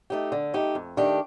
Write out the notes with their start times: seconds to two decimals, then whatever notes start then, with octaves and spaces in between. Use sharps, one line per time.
0.10 A3 D#4 G4
0.32 D3
0.54 A3 D#4 G4
0.75 F2
0.97 D#3 A3 D4 G4